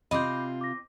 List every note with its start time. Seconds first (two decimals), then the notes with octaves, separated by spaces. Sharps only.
0.11 C3 C4 F4 D#5 B5 D6 G6
0.61 D6 A#6